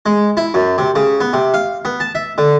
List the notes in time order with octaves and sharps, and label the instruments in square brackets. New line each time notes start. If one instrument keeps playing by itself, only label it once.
[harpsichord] G#3
E4
F#2
C3
C#3
B3
C3
F5
B3
A5
E5
D3